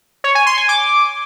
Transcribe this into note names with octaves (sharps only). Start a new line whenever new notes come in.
C#5
G#5
C6
G#5
D6